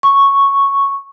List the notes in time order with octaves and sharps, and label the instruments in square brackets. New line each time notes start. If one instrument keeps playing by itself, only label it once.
[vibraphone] C#6